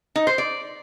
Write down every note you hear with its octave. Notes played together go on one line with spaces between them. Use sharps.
D#4
C5
D5